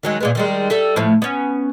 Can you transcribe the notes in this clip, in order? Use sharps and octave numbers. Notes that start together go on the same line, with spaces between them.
D#3 F#3 G#3
A#2 G#3 B3
D#3 G3 G#3
G3 A4 E5
A2 F3 A3
B3 C#4